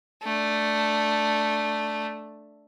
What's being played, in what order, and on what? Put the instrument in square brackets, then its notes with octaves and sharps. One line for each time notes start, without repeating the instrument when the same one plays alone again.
[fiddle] A3 D4